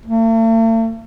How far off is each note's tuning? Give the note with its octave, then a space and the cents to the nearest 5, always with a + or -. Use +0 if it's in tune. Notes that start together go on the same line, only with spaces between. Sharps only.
A3 +45